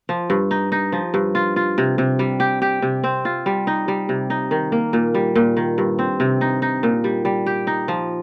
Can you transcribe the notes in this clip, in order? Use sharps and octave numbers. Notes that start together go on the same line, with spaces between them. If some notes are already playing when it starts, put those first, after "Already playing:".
F3
G2
D#4
D#4
F3
G2
F4
F4
C3
C3
G3
G4
G4
C3
C4
F4
G3
D#4
G3
C3
D#4
D#3
A#3
A#2
G3
A#2
D#3
G2
C4
C3
D#4
D#4
A#2
G3
G3
G4
D#4
F3